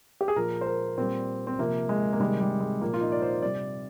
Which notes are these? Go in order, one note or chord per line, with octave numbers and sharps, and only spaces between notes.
G4
G#4
A#2 F3 A#4
C5
A#4
A#2 G3 C4
C4
C3 F3 A#3
G#3
A#3
C3 D#3 G3 G#3
G3
G#3
A#2 F3 A#3
F4
D#4
D5
C5
C3 G3 D5